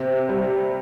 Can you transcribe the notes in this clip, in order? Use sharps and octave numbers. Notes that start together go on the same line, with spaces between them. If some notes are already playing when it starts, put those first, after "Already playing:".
Already playing: C3
G3